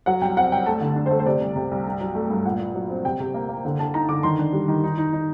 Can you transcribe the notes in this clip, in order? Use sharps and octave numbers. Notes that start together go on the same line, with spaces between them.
F#3 F#5
C2 G5
C4 F#5
C2 G5
A3 A5
D3
D4
C5
A3
C5
C3 D5
C2
C3
C2
G2
F#3
A3
G2
A#2 F#5
A#2
F#3
C4
C3 G5
C3
A#3
A#3
D3
D3 A5
D#4 A#5
D3 D6
D#3 C6
D4
G3
D#3
D#4
D#4
D#4